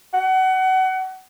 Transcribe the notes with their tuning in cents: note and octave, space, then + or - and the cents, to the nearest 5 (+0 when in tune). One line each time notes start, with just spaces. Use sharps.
F#5 +25